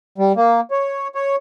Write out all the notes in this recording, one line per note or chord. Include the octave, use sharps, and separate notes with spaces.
G3
A#3
C#5
C#5